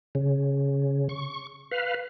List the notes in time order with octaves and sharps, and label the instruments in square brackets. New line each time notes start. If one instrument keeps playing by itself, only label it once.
[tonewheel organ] C#3
C#6
B4 F5